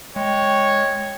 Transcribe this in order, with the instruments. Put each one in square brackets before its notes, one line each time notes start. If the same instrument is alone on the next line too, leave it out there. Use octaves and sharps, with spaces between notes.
[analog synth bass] G#3 [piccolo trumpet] C#5 [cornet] G5